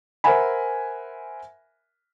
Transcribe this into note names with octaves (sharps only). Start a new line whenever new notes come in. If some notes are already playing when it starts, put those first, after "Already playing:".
A#4 C5 E5 F#5 G#5 B5